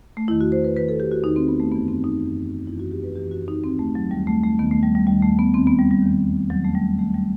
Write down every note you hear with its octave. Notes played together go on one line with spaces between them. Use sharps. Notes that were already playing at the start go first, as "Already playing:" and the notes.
A3
E2 D#3 E4
F#4
C5
B4
E2 D#3 B4
A4
G4
F#4
E2 D#3 D#4
C4
B3
A3
F#2 E3 B3
C4
D#4
F#2 E3
F#2 E3 E4
F#4
G4
B4
F#2 E3 G4
F#4
D#4
D#2 D#3 C4
A3
F#3
D#2 D#3 G3
A3
A3
D#2 D#3 B3
A3
G3
G3
D#2 D#3 G3
A3
B3
E2 D#3 C4
B3
G3
G3
E2 D#3
E2 D#3 F#3
A3
G3
E2 D#3 A3
G3